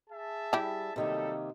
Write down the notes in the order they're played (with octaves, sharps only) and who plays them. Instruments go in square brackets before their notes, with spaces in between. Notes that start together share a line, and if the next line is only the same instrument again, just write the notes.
[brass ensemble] G#4 E5 A5
[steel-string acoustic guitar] G3 [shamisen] E4 G4
[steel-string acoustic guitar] C3 D#3 A#3 [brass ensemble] F#3 G3 A4